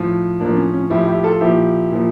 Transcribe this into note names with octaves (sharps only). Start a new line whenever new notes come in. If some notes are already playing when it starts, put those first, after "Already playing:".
Already playing: A2 F3
A2 F3 A#3 D4
C#4
C#4
A2 F3 E4 G4
E4 G4
F4 A4
A#2 F3 E4 G4
A#2 F3